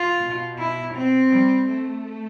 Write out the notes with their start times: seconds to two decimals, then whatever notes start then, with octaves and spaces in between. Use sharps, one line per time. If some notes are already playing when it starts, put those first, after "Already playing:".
Already playing: F4
0.20 B2
0.58 E4
0.94 C4
1.31 G3
1.68 A3